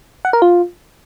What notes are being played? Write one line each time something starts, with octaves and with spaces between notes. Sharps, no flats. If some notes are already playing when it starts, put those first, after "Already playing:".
F#5
A#4
F4